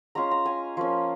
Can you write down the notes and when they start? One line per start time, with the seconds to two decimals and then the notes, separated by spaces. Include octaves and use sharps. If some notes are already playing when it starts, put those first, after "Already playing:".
0.15 G#3 C#4 F4 A#5
0.31 A#5
0.46 G#5
0.77 F3 A#3 C#4